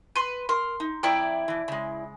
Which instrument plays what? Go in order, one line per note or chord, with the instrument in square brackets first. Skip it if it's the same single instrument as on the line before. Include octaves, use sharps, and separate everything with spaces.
[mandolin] B4 C6
[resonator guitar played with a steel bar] A#4 [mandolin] C6
[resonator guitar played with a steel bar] D#4
[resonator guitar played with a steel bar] F2 G5 A#5 [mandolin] E4 D5
[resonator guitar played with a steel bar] B2 E3
C#3 G#3